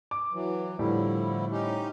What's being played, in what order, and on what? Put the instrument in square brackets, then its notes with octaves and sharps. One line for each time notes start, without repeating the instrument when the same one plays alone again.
[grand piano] D6
[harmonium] E3 F#3
[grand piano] A2 G3 [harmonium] D3 F3 E4
[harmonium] C#4 D#4 G4